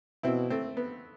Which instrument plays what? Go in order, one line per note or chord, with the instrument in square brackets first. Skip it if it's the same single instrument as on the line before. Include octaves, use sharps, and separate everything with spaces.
[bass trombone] B2 [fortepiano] C4 E4
[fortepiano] A3 C4
B3